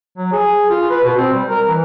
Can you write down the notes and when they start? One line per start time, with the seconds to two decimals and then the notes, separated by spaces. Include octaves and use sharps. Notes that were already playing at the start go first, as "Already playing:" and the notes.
0.18 F#3
0.32 G#4
0.70 F4
0.90 B4
1.04 B2
1.17 C4
1.33 G3
1.48 A#4
1.67 E3